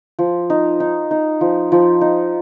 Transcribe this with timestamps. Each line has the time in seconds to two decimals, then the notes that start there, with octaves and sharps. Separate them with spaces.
0.19 F3
0.50 D#4
0.80 D#4
1.11 D#4
1.41 F3
1.72 F3
2.01 D#4